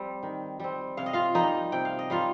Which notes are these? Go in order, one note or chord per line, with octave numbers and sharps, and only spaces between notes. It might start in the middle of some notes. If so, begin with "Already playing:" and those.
Already playing: G3 C4
D#3
G3 C4
C3 F5
D#5
F4 F5
G3 A#3 D#4 D#5
C3 G5
F5
D#5
G3 A#3 F4 F5